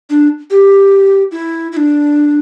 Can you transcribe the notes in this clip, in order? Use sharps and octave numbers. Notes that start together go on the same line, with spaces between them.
D4
G4
E4
E4
D4